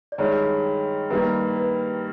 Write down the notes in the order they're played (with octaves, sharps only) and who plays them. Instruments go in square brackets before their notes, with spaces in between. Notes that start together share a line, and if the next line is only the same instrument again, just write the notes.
[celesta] D5
[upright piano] G2 D#3 G#3 [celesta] C#5
[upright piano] G2 D#3 G3 A#3 [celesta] B4
[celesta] B4